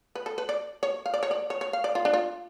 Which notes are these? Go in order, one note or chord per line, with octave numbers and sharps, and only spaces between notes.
B4
A4
B4
D5
C#5
F5
D5
C#5
D5
C#5
C#5
F5
D5
F4
D4
F4